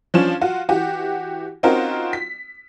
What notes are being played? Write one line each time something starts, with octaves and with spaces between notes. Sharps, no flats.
F3 C#4 D4 F4 E7
F4 F#4
E3 F#4 G4
C4 C#4 D#4 F4 F#4 A#4
B6